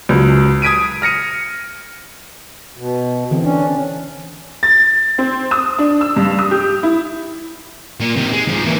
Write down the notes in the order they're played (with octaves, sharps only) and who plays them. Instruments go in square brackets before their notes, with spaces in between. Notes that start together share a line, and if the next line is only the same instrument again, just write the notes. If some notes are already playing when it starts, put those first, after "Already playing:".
[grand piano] C#2 F#3
D#6 G#6 B6 D7 D#7
F6 A#6 C#7 D#7
[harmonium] B2
[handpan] D3 E3 C4
[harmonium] C#4 [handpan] D4
[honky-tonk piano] A6
C4
D#6
D4
E6
G2
D#6
G4
E4
[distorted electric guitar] A#2
C3 D#3
G#3
G#2 F3
A#2 E3